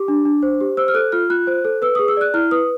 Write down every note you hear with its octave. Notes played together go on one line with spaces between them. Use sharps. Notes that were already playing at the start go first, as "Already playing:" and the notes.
Already playing: G4 D6
D4
D4
C5
G4
C5 E6
F6
A4 F#6
F4 F6
F4 F#6
C5
A4
B4 E6
G#4 D#6
E6
D5 F#6
E4 F6
B4 D#6